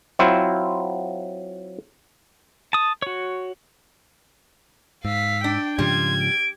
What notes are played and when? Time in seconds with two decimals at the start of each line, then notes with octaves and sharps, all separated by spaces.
0.19 F#3 C4 E4 F4 C5
2.73 A5 D#6
3.02 F#4 C#5
5.05 G#2 F5 E6 B6
5.44 D4 G5
5.79 G#2 C#3 F3 G3 C6 G#6
6.20 D7